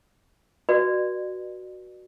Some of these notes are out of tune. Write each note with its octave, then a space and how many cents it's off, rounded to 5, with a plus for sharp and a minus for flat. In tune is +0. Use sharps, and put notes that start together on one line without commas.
F#4 +0 B4 -35 D5 +35